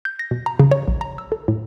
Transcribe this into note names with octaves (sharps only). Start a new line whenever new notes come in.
G6
A#6
B2
A#5
C#3
C#5
A#1
A#5
E6
A4
A2